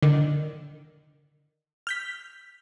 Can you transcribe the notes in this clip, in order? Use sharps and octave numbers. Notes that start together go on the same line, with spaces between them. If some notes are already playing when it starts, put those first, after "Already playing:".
D3 D#3
F6 G6 B6